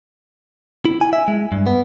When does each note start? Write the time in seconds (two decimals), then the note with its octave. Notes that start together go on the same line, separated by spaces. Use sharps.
0.85 E4
1.01 G#5
1.13 E5
1.28 G#3
1.52 G2
1.67 B3